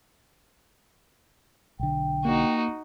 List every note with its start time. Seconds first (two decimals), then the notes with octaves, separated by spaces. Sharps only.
1.79 B1 D3 G5
2.25 A#3 D#4 F#4